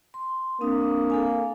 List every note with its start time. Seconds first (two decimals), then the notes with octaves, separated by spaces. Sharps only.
0.14 C6
0.61 A#3 C4 D4 D#6
1.10 A4 F5 G#5